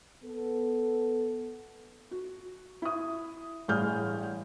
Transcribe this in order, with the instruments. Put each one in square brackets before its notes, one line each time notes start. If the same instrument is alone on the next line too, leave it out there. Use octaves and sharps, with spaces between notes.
[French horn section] B3 A4
[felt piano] F#4
E4 D#6
A1 G2 E3 G#4 F6 G6